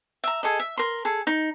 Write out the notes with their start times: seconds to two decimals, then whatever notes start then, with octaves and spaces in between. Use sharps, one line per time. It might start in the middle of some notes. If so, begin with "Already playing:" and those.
0.24 E5 A#5
0.43 G#4 A4 D#5
0.59 E5
0.78 A#4 C6
1.05 G#4 A4
1.27 D#4